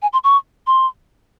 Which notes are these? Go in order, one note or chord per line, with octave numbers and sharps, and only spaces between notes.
G#5
C6
C#6
C6